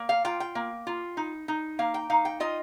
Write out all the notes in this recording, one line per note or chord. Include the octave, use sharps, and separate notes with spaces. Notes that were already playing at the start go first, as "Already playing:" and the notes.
Already playing: A#3
F5
F4 G5
G5
A#3
F4
D#4
D#4
A#3 F5
G5
D#4 F5
G5
F4 D#5